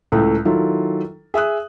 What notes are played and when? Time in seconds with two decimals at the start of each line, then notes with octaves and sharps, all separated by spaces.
0.12 C#2 A2 A3
0.45 D#3 F#3 E4 F4 A4
1.34 G#4 E5 D#6 F#6